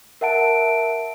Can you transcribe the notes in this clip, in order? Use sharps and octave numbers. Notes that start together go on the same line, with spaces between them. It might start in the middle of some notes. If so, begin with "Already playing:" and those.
A#4 E5 F#5 A5 D7